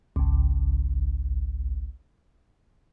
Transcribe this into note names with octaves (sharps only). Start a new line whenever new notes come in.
G#1 C#2